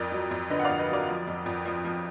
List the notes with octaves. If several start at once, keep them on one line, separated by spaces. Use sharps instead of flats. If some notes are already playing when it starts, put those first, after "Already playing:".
Already playing: F2 A#4 D5
F#3
F2
D3 B4 D#5
F#5
F2 D5 F5
B4 D#5
F#3 A#4 D5
F3
F2
F2
F3
F3